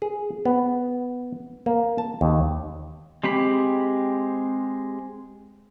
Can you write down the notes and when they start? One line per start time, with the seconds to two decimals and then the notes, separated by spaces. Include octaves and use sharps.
0.02 G#4
0.45 B3
1.66 A#3
1.98 A5
2.21 D#2
3.24 G#3 C4 G4 B5